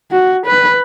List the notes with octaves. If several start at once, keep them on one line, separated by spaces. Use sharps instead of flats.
F#4
B4